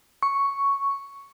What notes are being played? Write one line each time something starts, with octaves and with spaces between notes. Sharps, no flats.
C#6